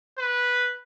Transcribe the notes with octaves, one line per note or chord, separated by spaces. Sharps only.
B4